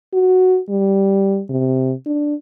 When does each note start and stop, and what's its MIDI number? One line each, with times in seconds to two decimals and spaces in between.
0.13 0.59 66
0.69 1.41 55
1.50 1.93 48
2.06 2.34 62